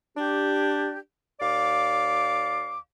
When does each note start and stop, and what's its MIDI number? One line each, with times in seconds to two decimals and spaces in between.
0.17 0.98 62
0.17 0.98 67
1.40 2.78 39
1.40 2.78 74
1.40 2.78 77
1.40 2.78 86